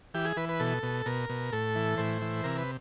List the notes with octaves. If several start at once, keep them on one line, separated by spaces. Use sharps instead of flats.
E3 G4
G#4
E3 B4
B4
B2 A4
B2
B2 A#4
B2
A2 A4
E3
A2 C5
E3
C3 A#4
B4